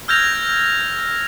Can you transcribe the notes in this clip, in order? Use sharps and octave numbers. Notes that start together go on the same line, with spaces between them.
E6 F6 G6 G#6 A#6 F7